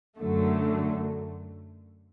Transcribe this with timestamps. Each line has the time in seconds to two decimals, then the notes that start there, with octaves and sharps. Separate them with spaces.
0.19 F#2 D3 F#3 A3